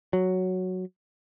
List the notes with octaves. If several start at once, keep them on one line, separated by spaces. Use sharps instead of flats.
F#3